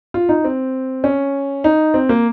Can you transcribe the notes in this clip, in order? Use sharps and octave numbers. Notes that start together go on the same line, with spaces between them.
F4
D#4
C4
C#4
D#4
C4
A#3